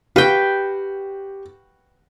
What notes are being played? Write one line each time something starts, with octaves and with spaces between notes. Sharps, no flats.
F#4 G4 B4 F5 G5